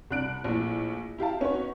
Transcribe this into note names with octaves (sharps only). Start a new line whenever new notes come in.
C2 D4 F#6 D7
A#1 A2
E4 G4 F5 A5
B3 C#4 D#4 F#4 B4 C#5